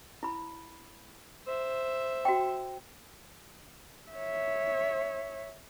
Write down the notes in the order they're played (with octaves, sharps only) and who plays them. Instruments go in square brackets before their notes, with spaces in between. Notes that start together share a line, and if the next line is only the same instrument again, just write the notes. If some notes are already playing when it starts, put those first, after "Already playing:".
[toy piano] E4 B5
[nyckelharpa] C5 E5
[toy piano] F#4 G5
[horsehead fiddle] C#5 E5